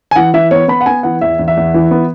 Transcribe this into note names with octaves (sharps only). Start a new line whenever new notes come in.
G#5
E3 F#5
E3 E5
B3 C#5
B3 B5
F#5
B3 G#5
E3 F#5
E2 E5
E2
E5
E2
E3
B3